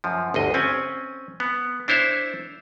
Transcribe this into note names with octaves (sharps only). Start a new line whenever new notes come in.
F#2 F3
G1 D2 D#5
C4 C#4 G#5
B3
D4 E4 C5 C#5 E5